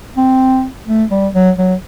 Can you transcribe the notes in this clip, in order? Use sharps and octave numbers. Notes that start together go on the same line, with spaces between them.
C4
A3
G3
F#3
F#3